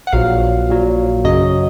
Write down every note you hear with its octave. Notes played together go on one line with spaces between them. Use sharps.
F#5
A#1 A#2 F#3 F5
A#1 A#2 F#3
F#2 C#3 F#3 D#5